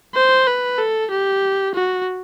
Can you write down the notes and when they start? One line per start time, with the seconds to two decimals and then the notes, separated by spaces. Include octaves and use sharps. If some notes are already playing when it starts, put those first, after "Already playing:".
0.15 C5
0.47 B4
0.78 A4
1.10 G4
1.75 F#4